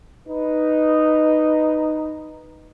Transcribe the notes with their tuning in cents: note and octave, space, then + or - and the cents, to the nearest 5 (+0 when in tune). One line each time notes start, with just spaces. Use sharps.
D#4 -5 B4 +0